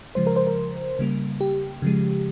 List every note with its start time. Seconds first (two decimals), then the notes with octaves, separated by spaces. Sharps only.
0.15 C#3 F3 G#3 C5
0.27 A#4
0.36 C5
0.47 A#4
0.99 C#3 G3 A#3
1.41 G4
1.82 C#3 F3 G#3